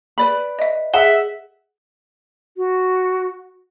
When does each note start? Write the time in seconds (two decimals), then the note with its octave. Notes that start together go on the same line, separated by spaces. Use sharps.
0.18 B4 D5 B5
0.59 D#5 E5
0.94 G#4 E5 F#5 E7 G7
2.57 F#4